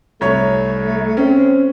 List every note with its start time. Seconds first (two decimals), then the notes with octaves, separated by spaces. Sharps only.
0.21 C2 A3 C#5 C#6
1.17 C4 C#4